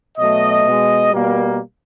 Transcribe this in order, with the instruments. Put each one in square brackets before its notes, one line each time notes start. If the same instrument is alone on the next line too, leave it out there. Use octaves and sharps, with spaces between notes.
[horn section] B2 F#3 A3 D#5
B2 G#3
B2 G3 A#3